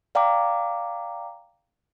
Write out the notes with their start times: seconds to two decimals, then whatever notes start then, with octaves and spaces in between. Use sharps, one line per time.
0.15 D5 F5 G5 A#5 D6